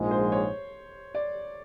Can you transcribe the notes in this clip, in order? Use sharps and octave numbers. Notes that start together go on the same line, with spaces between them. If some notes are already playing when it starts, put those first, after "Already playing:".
Already playing: A#1 G#2 F3 G#3
C5
C#5
D5